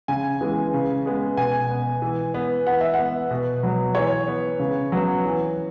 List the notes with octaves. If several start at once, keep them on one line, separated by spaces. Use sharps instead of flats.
C#3 G#5
E3 G#3 B3
C#3
G#3 B3
B2 G#5
B3
E3
B3
E3 F#5
E5
F#5
B3
B2
F#3 B3
E3 C#5
B3
C#3
F#3 B3
E3